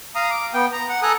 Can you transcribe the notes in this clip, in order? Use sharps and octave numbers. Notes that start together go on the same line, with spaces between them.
F5 A#5 D#6
D6
B3 G5
A#5
F#5
A4 G#5 A#5 D#6 F#6